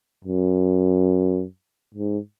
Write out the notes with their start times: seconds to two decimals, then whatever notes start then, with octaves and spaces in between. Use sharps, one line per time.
0.25 F#2
1.94 G#2